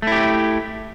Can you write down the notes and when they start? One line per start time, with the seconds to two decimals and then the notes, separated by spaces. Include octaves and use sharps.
0.02 A3
0.07 E4
0.12 G4